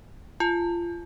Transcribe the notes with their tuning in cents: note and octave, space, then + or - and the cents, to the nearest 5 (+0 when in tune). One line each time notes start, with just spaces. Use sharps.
F4 -25 A5 -35